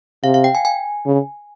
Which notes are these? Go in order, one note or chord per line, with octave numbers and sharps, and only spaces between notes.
C3 F5
F5
G5
G#5
G#5
C#3